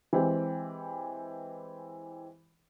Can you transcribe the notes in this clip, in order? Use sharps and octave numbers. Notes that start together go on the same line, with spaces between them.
E3 G#3 C4 G4